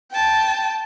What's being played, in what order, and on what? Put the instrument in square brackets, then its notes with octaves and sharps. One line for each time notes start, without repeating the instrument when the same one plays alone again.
[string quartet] G5 A5